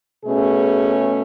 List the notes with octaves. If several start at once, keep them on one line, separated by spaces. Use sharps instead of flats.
B2 A3 C#4 G#4